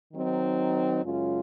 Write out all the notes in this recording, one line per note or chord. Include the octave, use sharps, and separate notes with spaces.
D#3 F#3 C4 D#4
F#2 C#3 G#3 C#4 F4